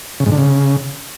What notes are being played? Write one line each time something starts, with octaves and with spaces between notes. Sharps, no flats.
C#3
G#2
D3
C#3